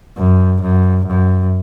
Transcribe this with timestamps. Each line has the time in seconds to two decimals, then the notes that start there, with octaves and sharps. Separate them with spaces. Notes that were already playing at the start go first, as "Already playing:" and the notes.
0.17 F#2
0.61 F#2
1.05 F#2